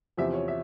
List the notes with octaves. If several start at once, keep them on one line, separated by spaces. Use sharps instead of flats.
E2 C3 F3 E5
C#5
E5